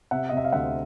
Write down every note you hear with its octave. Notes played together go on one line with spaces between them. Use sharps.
C3 E5 F#5
C3 D#5
E5
F5
D2 E5 F#5